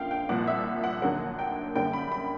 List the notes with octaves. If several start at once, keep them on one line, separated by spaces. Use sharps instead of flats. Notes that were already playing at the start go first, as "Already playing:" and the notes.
Already playing: F#2 D3 F3 A#3 F5 G5
G5
C2 A#2 F3 F#5
E5
F#5
D#2 D3 F#3 A#3 F#5
G5
F#2 D3 G3 A#3 G5
B5
B5